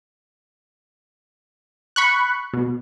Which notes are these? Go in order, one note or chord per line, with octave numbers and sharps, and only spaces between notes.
B5 C#6 F#6
B2